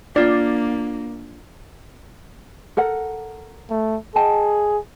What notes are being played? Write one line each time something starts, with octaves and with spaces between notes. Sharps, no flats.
A#3 D4 F4 D5
A4 A#4 F#5
A3
G#4 D#5 G5 A5